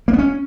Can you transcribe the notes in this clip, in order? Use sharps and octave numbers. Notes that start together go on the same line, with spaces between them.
A#3
B3
C#4